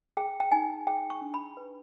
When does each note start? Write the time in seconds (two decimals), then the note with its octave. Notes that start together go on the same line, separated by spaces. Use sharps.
0.17 G#4 G5
0.40 G5
0.51 D#4 G#5
0.87 G#4 G5
1.10 C#6
1.21 D4
1.34 B5
1.57 B4